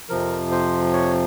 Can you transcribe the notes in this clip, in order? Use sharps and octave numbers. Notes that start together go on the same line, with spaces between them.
F2 C3 F3 A#4
C5
C#5